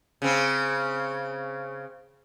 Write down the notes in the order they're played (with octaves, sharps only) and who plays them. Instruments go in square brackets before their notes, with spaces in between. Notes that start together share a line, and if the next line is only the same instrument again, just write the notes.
[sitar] C#3 C4